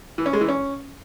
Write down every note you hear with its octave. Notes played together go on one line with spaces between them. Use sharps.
E3
C#4
G#3
E3
C#4